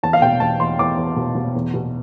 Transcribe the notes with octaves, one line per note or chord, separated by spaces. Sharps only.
E2 A5
F5
B2 G5
E2 A5
E2 C6
E2 D6
E2
B2
B2
E2
B2